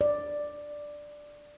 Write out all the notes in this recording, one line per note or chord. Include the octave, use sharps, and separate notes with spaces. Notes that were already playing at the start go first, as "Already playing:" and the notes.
D5